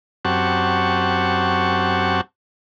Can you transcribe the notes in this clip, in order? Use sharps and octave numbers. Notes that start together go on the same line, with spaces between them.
F#2 C4 G4 F#5 A5 C#6